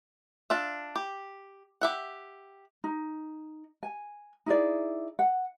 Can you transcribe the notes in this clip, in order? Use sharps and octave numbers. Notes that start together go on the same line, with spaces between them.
D4 F4 E5
G4
G4 E5 F#5
D#4
G#5
D#4 E4 G#4 D5
F#5